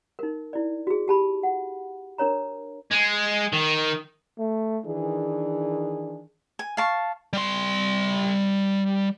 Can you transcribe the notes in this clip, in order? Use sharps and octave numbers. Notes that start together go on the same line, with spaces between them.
D#4 A#4
E4 D5
F#4 G#4
G4 A5 B5
F#5
D4 A#4 C#5 A#5
G#3
D#3
A3
D#3 E3 D4 G#4
G#5
F5 A5 C#6
G3 C6